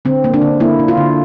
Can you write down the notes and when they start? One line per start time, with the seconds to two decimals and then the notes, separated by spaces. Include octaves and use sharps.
0.05 D3 C4
0.24 A#3
0.34 D4
0.42 D3
0.60 A#3 E4
0.79 D3
0.88 F4
0.98 D3